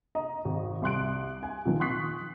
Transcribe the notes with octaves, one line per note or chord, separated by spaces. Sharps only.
D#5 A#5
G#1
C2 C6 F#6 D7
G#5
A#2 D#3 F3
C6 C#6 D#6 F#6 B6 C7